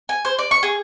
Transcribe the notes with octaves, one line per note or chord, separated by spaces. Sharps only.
G#5
C5
D5
C#6
G#4